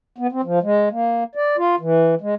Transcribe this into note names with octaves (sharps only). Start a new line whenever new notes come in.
B3
C4
F3
G#3
A#3
D5
F4
E3
G#3